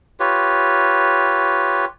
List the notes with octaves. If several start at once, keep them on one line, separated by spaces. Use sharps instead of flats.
F4 G4 B4 C#5